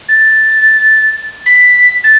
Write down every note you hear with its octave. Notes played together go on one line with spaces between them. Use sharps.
A6
B6
A6